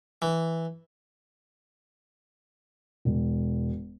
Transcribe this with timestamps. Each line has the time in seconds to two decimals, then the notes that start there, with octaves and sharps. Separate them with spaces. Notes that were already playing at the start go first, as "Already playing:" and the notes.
0.22 E3
3.05 E1